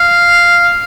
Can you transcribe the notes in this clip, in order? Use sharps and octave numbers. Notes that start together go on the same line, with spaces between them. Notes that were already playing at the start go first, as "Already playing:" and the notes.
Already playing: F5